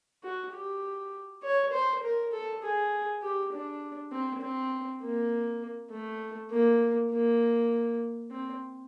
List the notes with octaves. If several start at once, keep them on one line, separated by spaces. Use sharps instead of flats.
F#4
G4
C#5
C5
A#4
A4
G#4
G4
D4
C4
C4
A#3
A3
A#3
A#3
C4